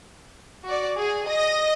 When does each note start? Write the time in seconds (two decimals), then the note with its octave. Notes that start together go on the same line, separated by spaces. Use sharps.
0.65 F#4 D5
0.97 G#4
1.28 D#5 D#6 A#6